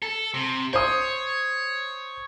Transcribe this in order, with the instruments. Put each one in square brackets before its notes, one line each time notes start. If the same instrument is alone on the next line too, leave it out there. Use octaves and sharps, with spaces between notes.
[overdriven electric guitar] A4
C3
[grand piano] C5 D#6 [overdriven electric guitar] C#5